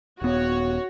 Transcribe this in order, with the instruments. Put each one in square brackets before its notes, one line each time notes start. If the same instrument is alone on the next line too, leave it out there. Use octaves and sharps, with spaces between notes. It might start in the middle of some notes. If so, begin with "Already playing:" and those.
[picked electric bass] D#1 B3 [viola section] F#4 C#5